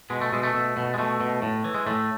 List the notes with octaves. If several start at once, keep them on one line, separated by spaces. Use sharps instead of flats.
B2 G#3
A3
B2 G#3
A3
B2
B2
G#3
B2 A3
B2
A2
E3
G#3
A2 A3